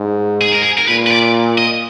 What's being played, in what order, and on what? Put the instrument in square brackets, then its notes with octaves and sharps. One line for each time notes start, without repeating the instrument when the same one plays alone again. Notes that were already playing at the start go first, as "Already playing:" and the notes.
Already playing: [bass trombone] G#2
[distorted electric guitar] G#4
A#4
G#4
A#4
[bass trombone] A#2 [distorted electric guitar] B4
[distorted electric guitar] B4
D5
D#5